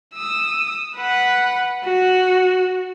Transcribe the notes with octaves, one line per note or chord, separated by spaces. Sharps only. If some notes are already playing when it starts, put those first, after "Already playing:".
D#6 E6
B4 F#5
F#4